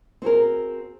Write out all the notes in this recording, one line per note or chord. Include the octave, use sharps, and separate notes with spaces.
C4 F#4 G#4 A#4